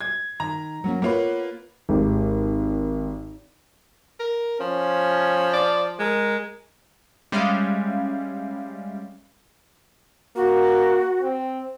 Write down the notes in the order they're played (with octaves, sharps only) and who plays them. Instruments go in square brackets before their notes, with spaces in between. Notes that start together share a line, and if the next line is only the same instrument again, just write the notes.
[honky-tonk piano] G#6
[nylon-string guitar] D#3 [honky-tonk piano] A#5
[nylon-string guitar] F#3 A#3 C#4
[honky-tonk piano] A#3 F4 B4 [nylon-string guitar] B3 C#5
[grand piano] G#1 G#3 G4
[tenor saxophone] A#4
[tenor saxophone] F3 [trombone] C#4
[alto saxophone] D5
[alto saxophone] G#3 [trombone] A#4
[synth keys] G3 G#3 C#4 E5 F5
[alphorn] A#3 [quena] F#4
[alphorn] C4